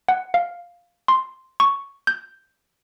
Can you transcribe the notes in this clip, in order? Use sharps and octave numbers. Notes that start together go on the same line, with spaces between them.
F#5
F5
C6
C#6
G6